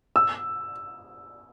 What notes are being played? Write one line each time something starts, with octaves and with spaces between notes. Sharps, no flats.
E6